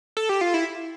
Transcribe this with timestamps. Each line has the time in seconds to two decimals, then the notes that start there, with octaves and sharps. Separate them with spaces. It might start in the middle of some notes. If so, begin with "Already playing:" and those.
0.17 A4
0.29 G4
0.41 F4
0.54 E4